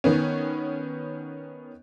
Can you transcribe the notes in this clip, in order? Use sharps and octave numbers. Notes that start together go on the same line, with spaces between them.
D#3 B3 C#4